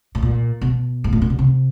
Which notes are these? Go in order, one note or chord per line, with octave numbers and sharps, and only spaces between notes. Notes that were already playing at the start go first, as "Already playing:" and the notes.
A2
A#2
B2
G#2
A2
A#2
B2
C3